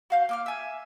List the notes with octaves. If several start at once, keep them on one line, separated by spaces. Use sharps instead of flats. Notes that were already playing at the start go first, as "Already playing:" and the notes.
F#4 F5 G6
A#3 D6 F6
E5 G#5